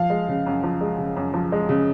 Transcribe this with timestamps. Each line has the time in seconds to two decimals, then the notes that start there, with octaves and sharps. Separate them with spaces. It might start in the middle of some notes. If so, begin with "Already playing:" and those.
Already playing: F3 F5
0.10 G#3
0.28 C#3
0.46 F#2
0.63 F3
0.81 G#3
0.98 C#3
1.16 F#2
1.34 F3
1.52 G#3
1.69 C#3